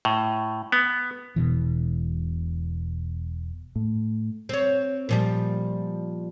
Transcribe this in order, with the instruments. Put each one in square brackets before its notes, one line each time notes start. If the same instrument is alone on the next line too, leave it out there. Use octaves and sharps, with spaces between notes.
[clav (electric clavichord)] A2
B3
[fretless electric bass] E1 B2 E3
[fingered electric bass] A2
[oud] C4 C#5
A#2 F3 G3